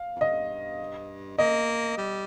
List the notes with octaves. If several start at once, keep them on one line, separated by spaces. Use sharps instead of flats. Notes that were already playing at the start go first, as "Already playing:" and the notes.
Already playing: F5
F2
G2 D#5
A#3 D#5
G3